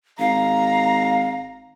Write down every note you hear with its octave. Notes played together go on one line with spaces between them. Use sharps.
G#1 F5 A#5